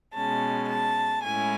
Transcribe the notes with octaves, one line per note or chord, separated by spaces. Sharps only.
B2 G#3 C#4 A5
A5
A2 G#3 C#4 E4 G#5